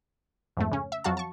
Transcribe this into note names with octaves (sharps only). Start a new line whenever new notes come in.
F2 G#2 A3
C#3 C#4
E5
F2 F#3 F#4 F5 A5
A5 C#6